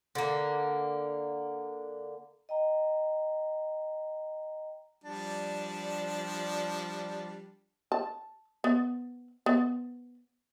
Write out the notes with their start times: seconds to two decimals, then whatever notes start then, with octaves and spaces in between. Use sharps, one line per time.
0.15 D3 A#3
2.49 D#5 G5 A#5
5.04 F3 G3 D4
7.92 A5
8.64 B3
9.46 B3